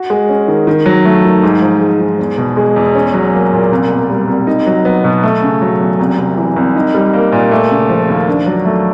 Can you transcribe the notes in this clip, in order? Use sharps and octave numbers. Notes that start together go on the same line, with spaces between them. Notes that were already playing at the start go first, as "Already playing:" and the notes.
Already playing: F#4
G#3
C#4
D#3
D#3
F#3
A3
D#3
G#2
F3
G#3
G#2
E2
B2
G#3
E2
C#4
F#3
A#3
A#2
C2
B2
G3
C2
D#4
F#3
B3
B2
A3
C#3
F#3
E2
C2
C3
E3
C2
D#4
G3
A#3
A#2
A3
C#3
F3
D#2
D4
F#3
A3